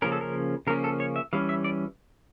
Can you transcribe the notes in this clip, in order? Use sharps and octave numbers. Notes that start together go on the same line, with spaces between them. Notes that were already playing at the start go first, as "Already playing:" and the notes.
C#3 F3 A#3 C#4 A#4
A4
A#4
C#3 F3 A#3 C#4 A#4
A4
C#5
E5
E3 G3 C#4 F5
E5
D5